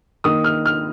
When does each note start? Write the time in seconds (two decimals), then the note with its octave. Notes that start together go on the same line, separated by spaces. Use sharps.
0.24 D#3 A#3 D#6
0.44 F6
0.66 F6